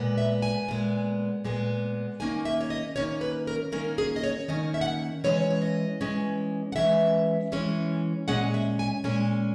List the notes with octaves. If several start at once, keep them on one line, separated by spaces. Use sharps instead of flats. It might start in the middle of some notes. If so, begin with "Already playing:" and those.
Already playing: A#2 G#3 B3
E5
G#5
A#2 G#3 B3
A#2 G#3 B3
D#3 A#3 C#4 G#5
E5
C#5
D#5
D#3 A#3 C#4 C#5
B4
A#4
D#3 A#3 C#4 A#4
G#4
D#5
C#5
D#3 A#3 C#4 D#5
E5
F#5
E5
E3 G#3 C#4 C#5
C#5
D#5
E3 G#3 C#4
F#5
E3 G#3 C#4 E5
E3 G#3 C#4
A#2 G#3 C#4 F#5
E5
G#5
A#2 G#3 C#4 G#5